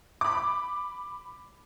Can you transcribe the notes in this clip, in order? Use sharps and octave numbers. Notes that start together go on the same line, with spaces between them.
B5 D6